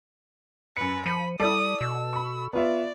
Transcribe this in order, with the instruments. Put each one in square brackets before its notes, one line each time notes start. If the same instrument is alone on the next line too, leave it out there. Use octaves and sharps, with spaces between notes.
[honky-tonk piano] F#2 C#7 [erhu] B4
[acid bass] F3 [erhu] B5 [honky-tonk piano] C#7 D#7
[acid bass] G3 [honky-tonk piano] E4 D5 [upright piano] A4 [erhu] D#6
[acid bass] B2 [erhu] E6
[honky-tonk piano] B5 C#6
[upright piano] B3 F4 E5 [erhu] D5